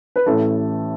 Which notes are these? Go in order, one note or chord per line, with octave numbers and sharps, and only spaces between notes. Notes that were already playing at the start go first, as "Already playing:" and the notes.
B4
A1 A2 E3 A4